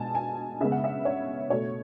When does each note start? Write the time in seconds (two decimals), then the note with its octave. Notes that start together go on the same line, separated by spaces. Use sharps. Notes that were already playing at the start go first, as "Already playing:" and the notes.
Already playing: B2 G#3 G#5 A5
0.15 G#5
0.60 C#3 G#3 B3 E5
0.72 F#5
0.84 E5
1.05 C#5
1.50 B2 A3 C#5